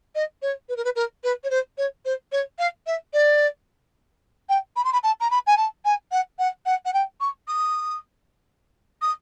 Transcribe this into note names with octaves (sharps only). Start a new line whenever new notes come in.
D#5
C#5
B4
A#4
B4
A#4
B4
C#5
C5
C#5
C5
C#5
F5
E5
D5
G5
B5
C6
B5
A5
A#5
B5
G#5
A5
G#5
F#5
F#5
F#5
F#5
G5
C#6
D#6
D#6